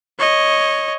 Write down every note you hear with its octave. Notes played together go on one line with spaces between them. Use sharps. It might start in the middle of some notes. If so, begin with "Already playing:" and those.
C#5 D#5